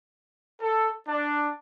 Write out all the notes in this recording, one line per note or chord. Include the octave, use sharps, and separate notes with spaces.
A4
D4